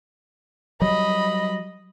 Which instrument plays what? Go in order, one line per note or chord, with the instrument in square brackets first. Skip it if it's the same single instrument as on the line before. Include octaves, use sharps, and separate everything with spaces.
[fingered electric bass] F#3 G3 [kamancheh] D#5 B5